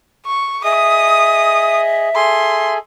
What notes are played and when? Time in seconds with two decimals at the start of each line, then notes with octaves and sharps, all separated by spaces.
0.26 C#6
0.64 G#4 D#5 E5 D#6
2.15 G#4 A4 G#5 C6